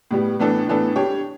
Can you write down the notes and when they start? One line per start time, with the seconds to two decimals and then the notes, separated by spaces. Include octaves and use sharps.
0.11 A2 G3 B3
0.39 A2 E3 B3 D4 A4
0.67 A2 E3 B3 D4 A4
0.96 G3 D4 G4 C#5